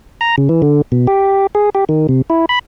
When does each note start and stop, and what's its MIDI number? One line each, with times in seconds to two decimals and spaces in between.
0.21 0.36 82
0.38 0.49 49
0.49 0.62 52
0.62 0.82 50
0.92 1.07 47
1.07 1.47 67
1.55 1.70 68
1.75 1.84 67
1.89 2.07 51
2.09 2.22 48
2.30 2.45 64
2.49 2.59 83